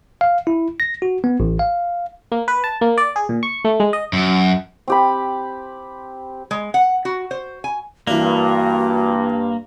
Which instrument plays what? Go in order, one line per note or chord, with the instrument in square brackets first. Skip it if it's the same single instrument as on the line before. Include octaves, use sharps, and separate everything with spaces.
[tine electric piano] F5
E4
A#6
F#4
B3
A1
F5
[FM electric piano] A#3
B4
A5
A#3
D5
G#4
A#2
C#6
A3
G#3
D#5
[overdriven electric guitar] F#2
[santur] C4 G4 B5
[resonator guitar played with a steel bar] G#3
F#5
F#4
C5
G#5
[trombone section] G2 [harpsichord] E3 D4 [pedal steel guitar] A#3 [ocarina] F#4